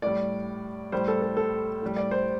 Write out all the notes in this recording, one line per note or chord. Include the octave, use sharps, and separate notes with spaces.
A2 G3 D5
A2 G3 C5
A4
A4
A4
A2 G3
D5
C5